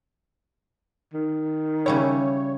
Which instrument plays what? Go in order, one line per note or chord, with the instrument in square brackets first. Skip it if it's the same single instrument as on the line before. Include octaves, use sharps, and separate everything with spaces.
[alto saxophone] D#3
[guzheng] C#3 G3 E4 [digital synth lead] C#5